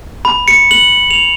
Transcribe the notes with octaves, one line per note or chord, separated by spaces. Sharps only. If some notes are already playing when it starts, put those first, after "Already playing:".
B5
C#7
F#7
F7